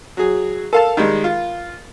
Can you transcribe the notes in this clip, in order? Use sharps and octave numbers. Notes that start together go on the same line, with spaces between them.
F#3 G#4
A4 A#4 F5 A5
D#3 G3 G#3
F4